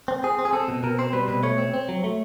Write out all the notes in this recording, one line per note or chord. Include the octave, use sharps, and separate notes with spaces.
C4
C4 G#4
C4
G#4
C4 A4
B2
B2 A#4
C4 C5
G3 B4
B2 B4
A3 C#5
C4
C4
F#3
A3